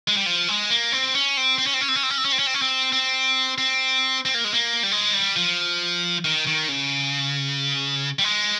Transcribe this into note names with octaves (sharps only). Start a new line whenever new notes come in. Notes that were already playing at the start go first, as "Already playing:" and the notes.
G#3
G3
F3
G#3
A#3
C4
C#4
C4
C4
C#4
C4
C#4
C4
C#4
C4
C#4
C4
C#4
C4
C#4
C4
C#4
C4
C4
C4
C4
A#3
G#3
A#3
G3
G#3
G3
F3
D#3
D#3
C#3
G3
G#3